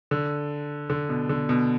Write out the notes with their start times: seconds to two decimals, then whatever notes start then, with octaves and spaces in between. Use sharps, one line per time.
0.11 D3
0.90 D3
1.09 B2
1.29 D3
1.49 B2